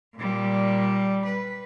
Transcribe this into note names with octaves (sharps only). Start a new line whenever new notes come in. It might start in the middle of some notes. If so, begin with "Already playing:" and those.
A#2 G3
B4